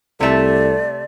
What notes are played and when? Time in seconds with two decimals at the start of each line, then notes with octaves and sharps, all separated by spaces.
0.20 C2 C3 A3 A4 D5